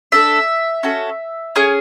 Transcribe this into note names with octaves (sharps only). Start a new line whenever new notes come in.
D4 A4 E5
C#4 F#4 A4
C#4 G#4